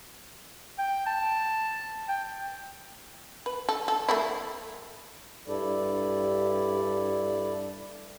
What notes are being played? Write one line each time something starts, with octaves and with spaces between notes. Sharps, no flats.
G5
A5
G5
B4
A4
A4
A3 A#3 E4
G2 E4 A4 D5